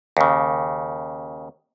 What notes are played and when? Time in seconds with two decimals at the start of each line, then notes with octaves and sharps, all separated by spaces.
0.17 D#2 C#3